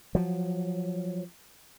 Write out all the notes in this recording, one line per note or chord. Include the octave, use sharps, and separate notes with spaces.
F3 F#3